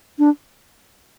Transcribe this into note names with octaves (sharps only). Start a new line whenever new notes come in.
D4